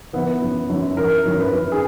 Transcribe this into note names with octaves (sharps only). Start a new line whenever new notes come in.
E3 B3
F#2
F#2
E3 A#4
F#2
B4
F#2
G#4